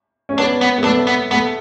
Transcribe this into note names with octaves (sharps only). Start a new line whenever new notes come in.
C#4
B3 D4
B3
B3
A3 D4
B3
A3 B3